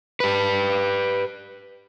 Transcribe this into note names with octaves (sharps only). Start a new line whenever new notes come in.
G4 B4